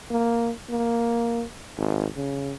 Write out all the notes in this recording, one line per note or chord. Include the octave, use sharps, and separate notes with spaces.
A#3
A#3
G#1
C#3